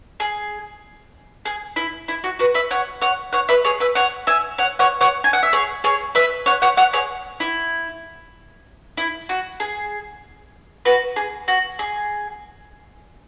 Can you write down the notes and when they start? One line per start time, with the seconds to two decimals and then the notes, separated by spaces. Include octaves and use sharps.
0.20 G#4
1.45 G#4
1.76 E4
2.08 E4
2.24 F#4
2.39 F#4 B4
2.54 B4 E5
2.71 C#5 F#5
3.01 C#5 F#5
3.33 C#5 F#5
3.49 B4 E5
3.64 G#4 C#5
3.80 B4 E5
3.95 C#5 F#5
4.27 E5 G#5
4.58 C#5 F#5
4.79 C#5 F#5
5.01 C#5 F#5
5.24 G#5
5.33 F#5
5.43 E5
5.53 G#4 C#5
5.84 G#4 C#5
6.15 B4 E5
6.46 C#5 F#5
6.62 C#5 F#5
6.77 C#5 F#5
6.93 G#4 C#5
7.40 E4
8.97 E4
9.29 F#4
9.60 G#4
10.85 F#4 B4
11.16 G#4
11.48 F#4
11.79 G#4